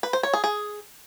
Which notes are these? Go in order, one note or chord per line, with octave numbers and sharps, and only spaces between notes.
B4
C5
C#5
G#4
G#4